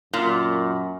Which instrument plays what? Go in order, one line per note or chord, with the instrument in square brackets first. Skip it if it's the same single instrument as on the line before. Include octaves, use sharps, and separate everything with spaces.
[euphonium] F#2 [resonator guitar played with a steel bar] A#2